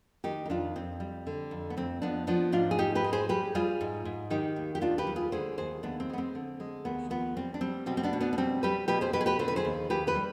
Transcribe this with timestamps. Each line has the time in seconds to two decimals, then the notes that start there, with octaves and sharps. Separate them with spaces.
0.24 D#3 D#4 G4
0.45 D#4
0.49 F2 D4 F4
0.76 F2 C4
1.00 G3
1.27 D3
1.51 F2
1.70 B3
1.77 F2 C4
2.02 F3 B3 D4
2.27 F3 B3 D4
2.52 G#2 D4 F4
2.71 G#4
2.79 G#2 D#4 G4
2.95 G4 B4
3.04 G#3
3.13 G#4 C5
3.29 G3 G4 B4
3.55 G3 F4 G#4
3.81 G#2
4.05 G#2
4.30 D#3 D#4 G4
4.56 D#2
4.75 G4
4.81 D#2 D4 F4
4.98 G4 B4
5.07 G3
5.16 F4 G#4
5.32 D3 G#4 C5
5.58 D#2 G#4 C5
5.83 D#2 B3 D4
6.00 C4
6.10 G#3 B3
6.18 C4
6.35 D3
6.60 G#3
6.85 D#2 B3
7.10 F3 B3
7.37 G3 C4
7.54 D4
7.61 G3 C4
7.86 B2 C4
7.97 C4
8.03 B3 D4
8.13 B2
8.20 B3 D4
8.33 D4
8.38 G3 C4
8.63 G3 G4 B4
8.88 B2 G4 B4
9.01 G#4 C5
9.13 B2 G4 B4
9.21 G#4
9.26 G4 B4
9.39 D3 C5
9.48 B4
9.56 G#4 C5
9.65 D#2
9.90 D#2 G4 B4
10.07 G4 B4
10.15 G3